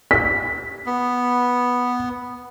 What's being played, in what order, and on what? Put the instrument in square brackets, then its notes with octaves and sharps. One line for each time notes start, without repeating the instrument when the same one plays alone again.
[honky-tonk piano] B6
[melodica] B3